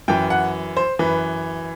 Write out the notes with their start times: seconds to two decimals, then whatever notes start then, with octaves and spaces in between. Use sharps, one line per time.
0.08 F#2 E3 G5
0.30 F#5
0.77 C5
0.99 F#2 E3 B4